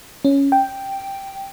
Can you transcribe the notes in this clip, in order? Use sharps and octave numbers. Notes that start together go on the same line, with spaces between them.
C#4
G5